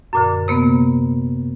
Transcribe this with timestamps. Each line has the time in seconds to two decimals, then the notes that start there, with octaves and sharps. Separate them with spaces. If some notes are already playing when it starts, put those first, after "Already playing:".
0.13 F#2 A#2 D3
0.48 C3 A#3 B3